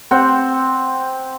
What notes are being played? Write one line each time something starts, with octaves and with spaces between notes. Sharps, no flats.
C4 F#5 G5